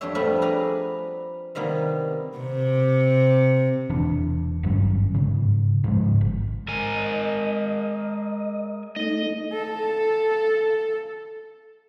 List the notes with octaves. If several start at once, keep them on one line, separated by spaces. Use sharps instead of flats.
F2 G3 D4 G4 C#5 E5
F3 G3 A3 B3 E5 B5
G#4 B4 D5 G#5 A#5
C3 D#3 G3 A#3 B3
C3
E1 E3 D4
G#1 G2 F#3 C#4
G#2 C#3
G#2 C#3 F3 G#3
G#1
G#3 A#4 G#5
D#5
A3 D#4 D#5
A4 A5